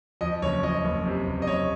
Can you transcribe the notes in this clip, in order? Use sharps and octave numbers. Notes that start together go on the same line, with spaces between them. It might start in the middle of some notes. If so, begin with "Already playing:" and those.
F2 D#5
F#1 C#5
F2 D#5
F#1
C3
F#1
D#5
F#1 C#5